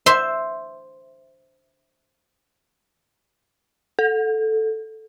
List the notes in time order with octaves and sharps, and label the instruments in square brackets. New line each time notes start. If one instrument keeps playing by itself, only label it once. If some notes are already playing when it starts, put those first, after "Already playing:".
[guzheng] C5 E5 C6
[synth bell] A4